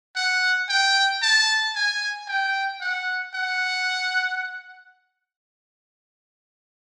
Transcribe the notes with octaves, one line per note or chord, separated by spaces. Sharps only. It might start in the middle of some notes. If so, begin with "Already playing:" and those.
F#5
G5
A5
G#5
G5
F#5
F#5